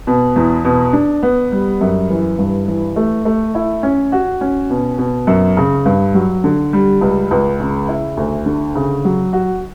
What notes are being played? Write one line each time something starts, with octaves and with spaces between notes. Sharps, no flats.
B2
E2
B2
D4
B3
G3
F#2
E3
G2
E3
A3
A3
E4
C#4
F#4
C#4
B2
B2
F#2
C#3
G2
F#3
D3
G3
C#2
C#2
C#3
E4
D2
D3
C#3
F#3
F#4